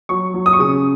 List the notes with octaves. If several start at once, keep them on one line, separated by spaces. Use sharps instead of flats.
F#3 C#6
F#3
D#6
C#6
C#3 D#6